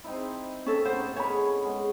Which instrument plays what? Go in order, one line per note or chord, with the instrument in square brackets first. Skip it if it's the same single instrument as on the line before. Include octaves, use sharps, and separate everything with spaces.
[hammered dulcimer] C4 D#4 E4
[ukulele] C#4 A4
[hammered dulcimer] A2 B3 B5 [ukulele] C5
[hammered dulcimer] C#4 G#4 [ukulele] C#5 B5
[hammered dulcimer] G#3 B3